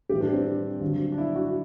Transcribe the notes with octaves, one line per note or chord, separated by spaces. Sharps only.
A2 E3 G3 G4
D4
C4
G2 D3 F#3
D4
E4
F#4